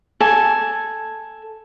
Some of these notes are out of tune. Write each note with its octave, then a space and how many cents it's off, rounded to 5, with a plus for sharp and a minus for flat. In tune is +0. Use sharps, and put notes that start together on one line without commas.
A4 +0 G#5 +0